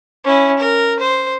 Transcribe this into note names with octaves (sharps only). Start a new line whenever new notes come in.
C#4 E4
A#4
C5